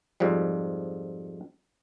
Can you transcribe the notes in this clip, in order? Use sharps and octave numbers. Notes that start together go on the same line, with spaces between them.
F2 G#2 F3 G3